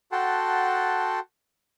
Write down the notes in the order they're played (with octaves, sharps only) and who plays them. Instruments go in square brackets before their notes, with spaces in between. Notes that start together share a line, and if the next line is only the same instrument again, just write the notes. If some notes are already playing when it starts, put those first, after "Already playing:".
[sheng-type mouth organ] F#4 A4 F#5 G5 A5 C6